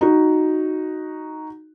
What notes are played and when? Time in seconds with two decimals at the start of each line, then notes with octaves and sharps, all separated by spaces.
0.01 D#4 F#4